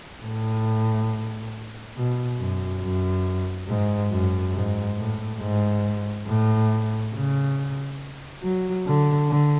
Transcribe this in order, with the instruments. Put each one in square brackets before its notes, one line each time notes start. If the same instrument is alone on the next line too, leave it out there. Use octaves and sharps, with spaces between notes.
[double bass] A2
B2
F#2
F#2
G#2
F#2
G#2
A2
G#2
A2
C#3
F#3
D3
D3